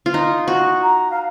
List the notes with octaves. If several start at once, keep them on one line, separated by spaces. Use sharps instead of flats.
F4
D#4
F#4
A#5
F5